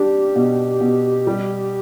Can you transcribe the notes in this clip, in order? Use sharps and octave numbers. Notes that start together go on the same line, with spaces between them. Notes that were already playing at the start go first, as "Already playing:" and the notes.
Already playing: G3 D4 G4
B2
B2
G3